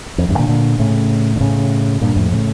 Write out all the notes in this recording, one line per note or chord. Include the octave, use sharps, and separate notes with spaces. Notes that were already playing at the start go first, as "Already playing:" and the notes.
F2
E2 G2
A#2 D3
A#2 D3
A2 C#3
D3
A2 C#3
G2 A#2
F2 A2
A2 C#3